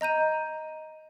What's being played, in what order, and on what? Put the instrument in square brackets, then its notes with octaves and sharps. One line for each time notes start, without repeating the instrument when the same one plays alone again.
[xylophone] D#5 A#5 G6 D#7